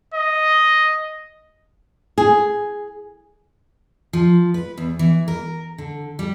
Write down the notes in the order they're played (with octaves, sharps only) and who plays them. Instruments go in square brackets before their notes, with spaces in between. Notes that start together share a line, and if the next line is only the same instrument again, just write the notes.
[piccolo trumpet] D#5
[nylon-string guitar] G#4
[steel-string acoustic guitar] F3
B4
E2
E3
A#4
D3
G3